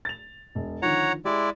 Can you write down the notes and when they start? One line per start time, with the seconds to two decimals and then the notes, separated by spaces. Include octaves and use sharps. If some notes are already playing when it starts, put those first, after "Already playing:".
0.05 A6 F7
0.55 E1
0.82 D3 D#3 F3 C#5 F#5 A#5
1.25 G#3 E4 G4 D5